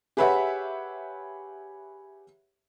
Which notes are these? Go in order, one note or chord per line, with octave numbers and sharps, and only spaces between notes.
G4 G#4 B4 C#5 E5 F#5